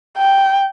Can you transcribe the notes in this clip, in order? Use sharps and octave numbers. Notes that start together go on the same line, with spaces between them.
G5